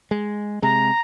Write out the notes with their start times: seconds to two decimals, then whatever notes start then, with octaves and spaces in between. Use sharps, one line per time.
0.11 G#3
0.62 C3 G#3 A#5